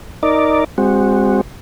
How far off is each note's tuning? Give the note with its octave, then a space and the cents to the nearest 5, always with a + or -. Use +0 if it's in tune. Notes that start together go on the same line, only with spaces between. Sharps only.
D#4 +10 A#4 +0 D5 +0
G#3 -35 C4 +0 F#4 -5